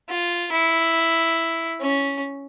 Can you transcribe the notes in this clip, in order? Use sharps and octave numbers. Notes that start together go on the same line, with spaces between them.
F4
E4
C#4